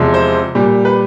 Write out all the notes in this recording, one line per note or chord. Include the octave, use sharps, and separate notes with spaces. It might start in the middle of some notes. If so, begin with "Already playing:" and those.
Already playing: E2 C3 F3 G#3
C5
A#2 G3
B4